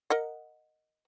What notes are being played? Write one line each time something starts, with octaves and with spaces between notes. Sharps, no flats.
A#4 D#5 F#5